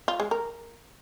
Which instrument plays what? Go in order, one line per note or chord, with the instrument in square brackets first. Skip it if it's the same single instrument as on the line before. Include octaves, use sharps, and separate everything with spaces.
[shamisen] F4
G#3
A#4